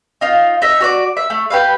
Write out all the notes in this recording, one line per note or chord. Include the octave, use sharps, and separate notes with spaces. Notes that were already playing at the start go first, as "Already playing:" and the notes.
D#4 F4 F5
D#4 E5
F#4 C#5 D5
E5
A3
G4 B4 F5